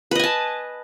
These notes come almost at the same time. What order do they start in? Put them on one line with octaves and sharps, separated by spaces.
B4 D#5 G#5 A5